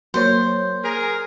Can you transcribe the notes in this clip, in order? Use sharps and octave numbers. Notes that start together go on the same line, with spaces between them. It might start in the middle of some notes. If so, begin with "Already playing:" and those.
F#3 A#3 C5 C#5
G#4 A#4